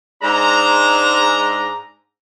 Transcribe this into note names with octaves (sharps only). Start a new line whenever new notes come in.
G#2 G#3 D4 A#5